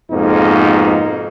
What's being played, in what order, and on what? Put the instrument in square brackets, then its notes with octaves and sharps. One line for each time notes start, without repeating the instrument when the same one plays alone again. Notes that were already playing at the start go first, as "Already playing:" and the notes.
[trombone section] F2 G#2 B2 A#3 D#4